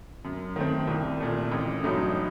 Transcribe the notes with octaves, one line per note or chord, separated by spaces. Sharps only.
F#2
D#3 A3 C4
C2
A#2 A3
A1
G2 F#3 A3 D#4